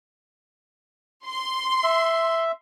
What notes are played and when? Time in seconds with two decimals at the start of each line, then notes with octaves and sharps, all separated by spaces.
1.26 C6
1.83 E5